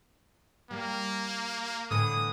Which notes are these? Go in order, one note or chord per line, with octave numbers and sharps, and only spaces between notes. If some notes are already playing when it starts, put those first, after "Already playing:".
G3 A#3
A2 D3 E3 D#6